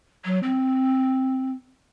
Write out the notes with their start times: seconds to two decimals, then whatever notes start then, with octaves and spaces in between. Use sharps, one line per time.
0.25 F#3
0.43 C4